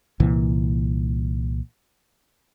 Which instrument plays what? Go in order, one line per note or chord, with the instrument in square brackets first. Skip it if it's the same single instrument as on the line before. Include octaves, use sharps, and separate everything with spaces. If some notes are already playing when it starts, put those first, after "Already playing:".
[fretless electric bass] C2 A#2 E3